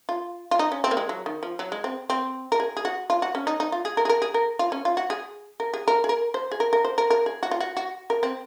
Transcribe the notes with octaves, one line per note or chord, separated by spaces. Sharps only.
F4
F4
D#4
C#4
C4
A#3
G#3
F#3
D#3
F3
F#3
G#3
C4
C4
A#4
G#4
G#4
F#4
F4
F#4
C#4
D#4
D#4
F4
G#4
A#4
G#4
A#4
G#4
A#4
F4
C#4
F4
F#4
G#4
A#4
G#4
A#4
G#4
A#4
C5
G#4
A#4
A#4
C5
A#4
A#4
G#4
F#4
F4
F#4
F#4
A#4
C4